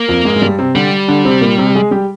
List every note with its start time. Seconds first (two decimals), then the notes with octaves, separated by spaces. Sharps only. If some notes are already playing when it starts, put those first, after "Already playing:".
Already playing: A#3
0.08 F2 F3
0.25 G#2 G#3
0.36 G#3
0.42 G2 G3
0.59 C3 C4
0.75 D3 G3 D4
1.08 D3 D4
1.25 C3 C4
1.41 A#2 A#3
1.58 C3 C4
1.75 G#3 G#4
1.91 G3 G4